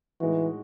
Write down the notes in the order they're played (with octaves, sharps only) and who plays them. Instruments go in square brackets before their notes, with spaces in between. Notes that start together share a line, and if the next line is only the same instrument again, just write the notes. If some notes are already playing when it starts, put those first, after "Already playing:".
[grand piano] A2 G#3 D#4 F#4 [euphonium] E3